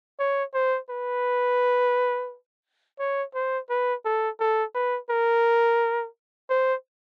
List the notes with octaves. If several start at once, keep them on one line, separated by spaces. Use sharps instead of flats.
C#5
C5
B4
C#5
C5
B4
A4
A4
B4
A#4
C5